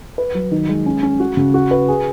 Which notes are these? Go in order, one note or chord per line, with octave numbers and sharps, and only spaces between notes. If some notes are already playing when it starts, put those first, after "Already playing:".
B4
F#3
D#3
G#3
C#4
C#4
F#4
C#3
F#4
B4
G#4